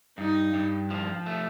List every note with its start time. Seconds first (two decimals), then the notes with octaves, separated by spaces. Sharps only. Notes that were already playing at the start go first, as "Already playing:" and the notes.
0.18 G2 D#4
0.54 G2
0.90 F3
1.26 A3